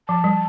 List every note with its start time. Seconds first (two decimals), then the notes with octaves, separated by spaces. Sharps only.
0.09 F3 A5
0.24 G3